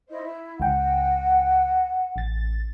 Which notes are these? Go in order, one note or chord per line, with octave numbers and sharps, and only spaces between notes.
E4 C5 D#5
E4
C#2 F#5 G5
A1 A6